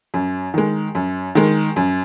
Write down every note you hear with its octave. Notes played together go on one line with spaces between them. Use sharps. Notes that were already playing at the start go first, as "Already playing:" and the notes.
F#2
D#3 G#3
F#2
D#3 G#3
F#2